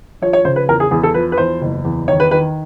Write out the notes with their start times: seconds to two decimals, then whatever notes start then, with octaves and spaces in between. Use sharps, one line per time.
0.22 F3 C#5
0.33 C#5
0.45 C#3 C5
0.56 B4
0.68 E2 A#4
0.80 G#4
0.91 E2 G#4
1.03 A4
1.14 F3 B4
1.32 B4
1.38 E2 C5
1.61 F#1
1.85 E2
2.08 D#3 C#5
2.20 B4
2.31 D#3 B4